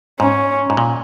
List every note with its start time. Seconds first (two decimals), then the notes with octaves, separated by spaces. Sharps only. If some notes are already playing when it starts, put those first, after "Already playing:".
0.20 G#2 C#4
0.70 G#2
0.77 A#2